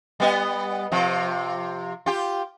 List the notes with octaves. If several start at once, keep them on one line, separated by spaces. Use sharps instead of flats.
G3 B3 D#5
C3 F3
F4 G4